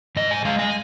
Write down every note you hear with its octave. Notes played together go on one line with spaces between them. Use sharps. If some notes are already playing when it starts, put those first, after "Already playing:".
G#2 D#5
G#5
G#3 F5
G#5